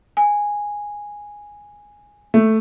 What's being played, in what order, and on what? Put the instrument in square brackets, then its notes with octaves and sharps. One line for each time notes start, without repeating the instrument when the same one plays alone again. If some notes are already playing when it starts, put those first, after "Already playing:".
[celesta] G#5
[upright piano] A3